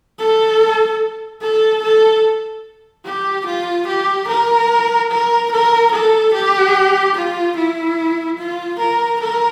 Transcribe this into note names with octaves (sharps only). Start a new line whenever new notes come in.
A4
A4
A4
G4
F4
G4
A#4
A#4
A#4
A4
G4
F4
E4
F4
A#4
A#4